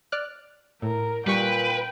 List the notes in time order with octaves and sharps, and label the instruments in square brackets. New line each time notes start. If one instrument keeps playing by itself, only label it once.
[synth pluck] D5 F6 F#6
[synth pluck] A2 [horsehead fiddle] A#4
[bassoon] A#2 [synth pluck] G3 C#6 C#7 [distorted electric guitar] B4 [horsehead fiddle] G5